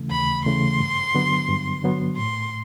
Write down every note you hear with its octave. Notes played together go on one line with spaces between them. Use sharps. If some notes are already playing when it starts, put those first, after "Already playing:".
Already playing: D#2 C#3 E3 A3
D#2 B5
C#3 E3 A3 C6
G2
D3 F#3 B3
G2
D3 F#3 B3
A2 C6